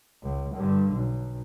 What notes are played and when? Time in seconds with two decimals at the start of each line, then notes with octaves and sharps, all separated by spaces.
0.22 C#2
0.55 G2 D3
0.92 B1